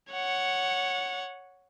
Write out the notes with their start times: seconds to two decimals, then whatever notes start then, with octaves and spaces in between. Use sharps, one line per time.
0.13 C#5 F#5